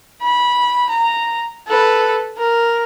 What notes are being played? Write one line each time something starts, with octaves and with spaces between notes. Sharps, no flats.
B5
A#5
A4 B4
A#4